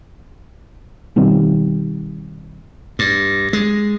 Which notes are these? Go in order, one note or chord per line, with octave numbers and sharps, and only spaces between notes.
B2 D#3 G3 C4
G2
G#3